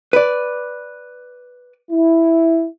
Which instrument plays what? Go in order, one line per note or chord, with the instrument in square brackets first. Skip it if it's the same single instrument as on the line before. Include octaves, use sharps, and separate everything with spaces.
[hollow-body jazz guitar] B4 D5
[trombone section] E4